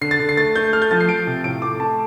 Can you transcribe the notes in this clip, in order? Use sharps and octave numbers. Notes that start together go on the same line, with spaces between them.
D3 C7
A6
D3
C7
A3 A6
A3 G6
A3 F6
G6
F3 A6
C7
F3 D7
C3
A2 D7
A3 D6
A3 A5